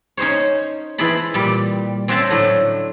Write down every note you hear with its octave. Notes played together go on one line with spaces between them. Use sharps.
C#4 D#4 C5 C#5
E3 C4 E4 G#4 A5 B5
A#2 G3
C4 C#4 F#4 C5 E5 A5
A2 D3 F#3 A3